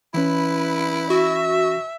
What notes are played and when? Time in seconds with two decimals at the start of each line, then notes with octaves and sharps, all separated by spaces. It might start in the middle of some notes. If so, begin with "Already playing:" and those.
0.14 E3 C#4 E4 B4
1.10 F#4 E5